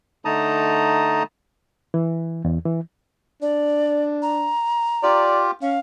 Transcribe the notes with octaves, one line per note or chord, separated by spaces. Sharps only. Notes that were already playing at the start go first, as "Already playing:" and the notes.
D3 A3 D#4 A5 A#5 D#6
E3
E2
E3
D4 D5
A#5
F4 G4 D5
C#4 F5